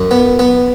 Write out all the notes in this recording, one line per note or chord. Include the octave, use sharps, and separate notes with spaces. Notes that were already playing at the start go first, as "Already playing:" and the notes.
Already playing: F#2
B3
B3